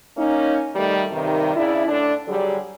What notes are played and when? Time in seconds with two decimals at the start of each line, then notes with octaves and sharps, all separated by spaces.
0.18 A#3 C#4 D#4
0.75 D#3 G3 A3
1.12 G2 C3 D#3
1.55 C#3 D4 E4
1.85 A2 D3 D4
2.27 D3 F#3 G3 G#4